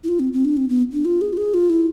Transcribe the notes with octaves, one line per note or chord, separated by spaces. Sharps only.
E4
F4
C4
C4
D4
C4
B3
D4
F4
G#4
F4
G#4
F4
E4